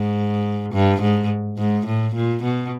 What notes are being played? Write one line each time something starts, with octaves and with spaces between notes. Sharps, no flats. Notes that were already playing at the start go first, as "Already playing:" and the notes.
Already playing: G#2
G2
G#2
G#2
A2
A#2
B2